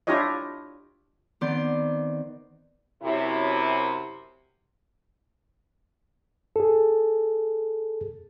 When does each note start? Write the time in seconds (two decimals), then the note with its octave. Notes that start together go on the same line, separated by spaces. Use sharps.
0.07 D4 E4 F4 G4 C#5 D#5
1.41 D#3 B3 C4 D5 C6 G6
3.02 F#2 C3 E4
6.56 G#4 A4